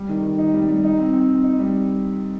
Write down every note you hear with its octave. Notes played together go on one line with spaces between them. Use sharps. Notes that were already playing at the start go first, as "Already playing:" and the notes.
Already playing: G3
D#3
D#3
D#4
G3
G3
D#4
C4
C4
C4
D#4
G3